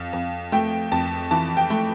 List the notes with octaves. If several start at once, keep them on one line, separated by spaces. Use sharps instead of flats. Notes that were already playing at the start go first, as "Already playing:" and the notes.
Already playing: F2 F5
F2
A3 G5
F2 A5
E3 A5
G5
A3